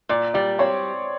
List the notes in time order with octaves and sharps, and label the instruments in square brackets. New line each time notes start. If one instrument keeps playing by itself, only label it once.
[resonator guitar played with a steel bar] A#2 [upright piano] D5
[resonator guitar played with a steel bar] G3 [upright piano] D5
[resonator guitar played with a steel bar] C4 [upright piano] C#5